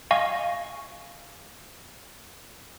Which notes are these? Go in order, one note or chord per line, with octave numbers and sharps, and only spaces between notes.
D#5 F5 G#5 C#6